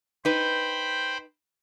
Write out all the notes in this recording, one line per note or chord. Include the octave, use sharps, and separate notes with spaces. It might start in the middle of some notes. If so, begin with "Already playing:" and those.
D#4 B4 C5 G5 B5